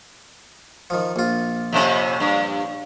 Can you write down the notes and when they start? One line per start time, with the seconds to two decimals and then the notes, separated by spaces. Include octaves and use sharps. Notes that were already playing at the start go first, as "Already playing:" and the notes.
0.90 D#3 F3
1.16 A#1 F4
1.73 F2 C3 C#4
2.20 G2